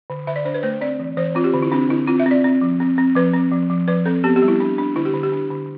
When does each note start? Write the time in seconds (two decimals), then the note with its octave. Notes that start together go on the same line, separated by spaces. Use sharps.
0.10 D3
0.27 D3 E5
0.36 D5
0.45 D4 C5
0.54 B4
0.63 A3 C5
0.81 C4 D5
0.99 E3
1.17 E3 C5
1.35 C4 F4
1.44 G4
1.54 D3
1.62 E4
1.72 C4 D4
1.89 D3 E4
2.07 C4 F4
2.20 E5
2.26 C4
2.31 D5
2.44 C4
2.61 F3
2.80 C4
2.98 C4
3.16 F3 B4
3.33 C4
3.52 F3
3.70 F3
3.88 F3 B4
4.06 C4 A4
4.24 B3 G4
4.36 G4
4.42 G3
4.48 E4
4.60 D4
4.78 D4
4.96 D3 E4
5.05 G4
5.14 D3
5.23 G4
5.32 D4
5.50 D3